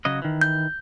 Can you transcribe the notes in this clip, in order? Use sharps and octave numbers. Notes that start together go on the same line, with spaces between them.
C#3 F#3 D#5
D#3 E3
G6